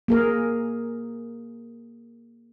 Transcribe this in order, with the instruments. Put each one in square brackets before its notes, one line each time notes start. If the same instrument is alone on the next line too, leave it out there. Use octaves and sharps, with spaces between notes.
[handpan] A#3 G#4 A#4